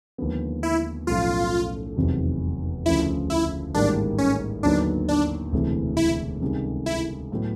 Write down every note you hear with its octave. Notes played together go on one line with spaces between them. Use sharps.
D#2 D3 F3 G#3 B3
E4
B1 A2 F3 A3 C#4 F4
F1 E2 C3 D#3 F#3
D2 C#3 F3 E4
E4
A1 G#2 D#3 G3 A#3 D4
C#4
D#2 D3 F#3 B3 D4 D#4
D4
E1 D2 C3 E3
E4
C#2 C3 D#3 G3
E4
A2 F#3 B3